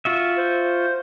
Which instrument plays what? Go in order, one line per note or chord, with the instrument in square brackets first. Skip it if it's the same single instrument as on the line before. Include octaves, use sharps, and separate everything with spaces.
[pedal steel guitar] F4 F#4 E5
[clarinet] C5